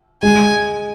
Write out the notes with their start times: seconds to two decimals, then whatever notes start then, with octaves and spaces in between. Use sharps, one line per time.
0.23 G#3 G#5